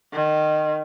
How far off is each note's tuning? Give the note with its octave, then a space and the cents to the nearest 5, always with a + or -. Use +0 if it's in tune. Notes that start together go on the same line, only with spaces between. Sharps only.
D#3 -20